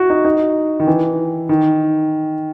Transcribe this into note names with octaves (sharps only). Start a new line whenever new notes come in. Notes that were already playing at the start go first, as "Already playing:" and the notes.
Already playing: E4 F#4
D#4
D#4
D#3
E3
D#3